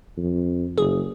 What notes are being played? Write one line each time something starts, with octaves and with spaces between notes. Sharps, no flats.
F2
F#1 G#4